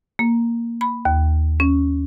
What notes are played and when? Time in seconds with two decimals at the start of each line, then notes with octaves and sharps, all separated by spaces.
0.19 A#3
0.81 B5
1.05 D#2
1.60 C#4